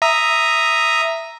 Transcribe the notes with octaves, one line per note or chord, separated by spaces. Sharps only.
E5 A#5 D#6